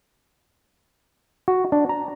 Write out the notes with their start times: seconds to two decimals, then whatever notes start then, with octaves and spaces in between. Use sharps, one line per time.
1.48 F#4
1.72 D4
1.89 A#5